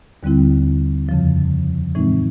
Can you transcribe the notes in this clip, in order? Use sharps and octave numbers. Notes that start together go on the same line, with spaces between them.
D#2 D3 G3 C4 E4
F2 C#3 F3
A2 E3 G#3 C4 D#4